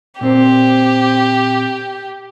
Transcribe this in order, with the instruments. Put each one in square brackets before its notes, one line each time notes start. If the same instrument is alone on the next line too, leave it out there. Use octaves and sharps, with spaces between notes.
[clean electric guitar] A#2 C4 C5 [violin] G4